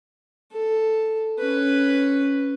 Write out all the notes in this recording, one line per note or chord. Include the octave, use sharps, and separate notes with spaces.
A4
C#4 B4